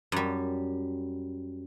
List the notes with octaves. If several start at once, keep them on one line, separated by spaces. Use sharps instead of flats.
F#2 G3